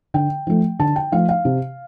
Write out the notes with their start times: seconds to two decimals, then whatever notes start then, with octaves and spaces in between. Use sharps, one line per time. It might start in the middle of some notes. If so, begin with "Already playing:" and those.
0.14 D3 G5
0.47 F3 A3
0.80 D3 A5
0.96 G5
1.12 F3 A3 F5
1.29 F5
1.45 C3